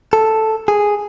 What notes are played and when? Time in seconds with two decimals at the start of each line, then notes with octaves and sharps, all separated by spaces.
0.13 A4
0.68 G#4